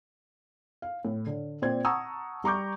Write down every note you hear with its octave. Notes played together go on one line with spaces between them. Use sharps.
F5
A2
D3
A#2 C4 C5 D5 G#6
F#5 A5 A#5 C#6 D#6 E6
G3 A#5 C#6 D6 G6